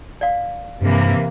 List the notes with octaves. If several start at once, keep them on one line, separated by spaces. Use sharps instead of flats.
D5 F5
G2 C3 E3 A#3